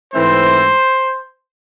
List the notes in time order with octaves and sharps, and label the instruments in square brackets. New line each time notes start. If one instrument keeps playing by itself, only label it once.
[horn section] G#2 E3 A3 C4 C5